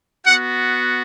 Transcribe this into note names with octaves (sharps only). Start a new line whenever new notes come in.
B3 F#4 F#5